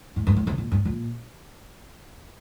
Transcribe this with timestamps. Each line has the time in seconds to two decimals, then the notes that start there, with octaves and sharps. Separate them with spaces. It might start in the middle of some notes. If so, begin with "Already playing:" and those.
0.16 A2
0.27 G2
0.37 A2
0.47 C3
0.58 A#2
0.71 G2
0.85 A#2